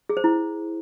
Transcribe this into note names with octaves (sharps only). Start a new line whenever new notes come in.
G#4
C5
E4